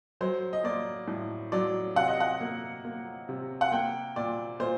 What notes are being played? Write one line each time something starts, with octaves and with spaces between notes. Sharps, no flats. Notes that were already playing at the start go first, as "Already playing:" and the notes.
F#3 C5
D#5
A#3 D5
A2
F#3 D5
C3 F#5
D#5
F#5
A#3
A#3
C3
F#5
A#3 G5
A#2 D5
A#2 C5